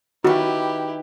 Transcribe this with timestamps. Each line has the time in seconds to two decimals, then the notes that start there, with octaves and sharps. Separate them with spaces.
0.25 D#3 E4 F#4 G4 B4